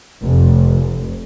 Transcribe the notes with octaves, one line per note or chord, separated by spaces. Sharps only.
F1